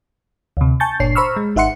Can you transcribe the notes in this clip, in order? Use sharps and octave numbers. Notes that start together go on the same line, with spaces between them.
D2 C3
G#5 A5 C#6 G6 A6
G1 A#2 D4 C#5 C7
C5 A#5 B5 C#6 E6 F6
G#3
G#1 D#4 E5 F#5 C6 C#7